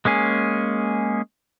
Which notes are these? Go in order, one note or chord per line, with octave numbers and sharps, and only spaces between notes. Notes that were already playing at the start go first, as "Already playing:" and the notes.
G#3 A#3 C#4 G#4